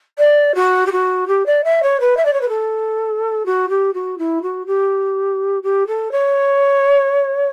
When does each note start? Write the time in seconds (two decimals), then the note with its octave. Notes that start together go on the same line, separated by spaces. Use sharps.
0.18 D5
0.55 F#4
0.86 G4
0.91 F#4
1.27 G4
1.46 D5
1.64 E5
1.82 C#5
2.00 B4
2.16 E5
2.25 D5
2.33 C#5
2.41 B4
2.48 A4
3.45 F#4
3.69 G4
3.93 F#4
4.18 E4
4.42 F#4
4.66 G4
5.63 G4
5.87 A4
6.11 C#5